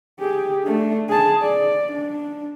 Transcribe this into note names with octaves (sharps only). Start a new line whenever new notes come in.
G4 G#4
A3 D4
G#4 A5
D5
D4